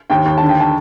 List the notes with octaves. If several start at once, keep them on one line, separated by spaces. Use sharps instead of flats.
D#2 G5
D#2
D3 A5
G5
A5